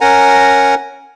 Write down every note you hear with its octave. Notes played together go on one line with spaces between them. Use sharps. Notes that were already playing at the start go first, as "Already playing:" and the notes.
C#4 A#4 F#5 G#5 A#5